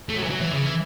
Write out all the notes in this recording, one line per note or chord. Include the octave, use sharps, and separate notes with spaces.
A3
F#3
E3
F#3
E3
C#3
E3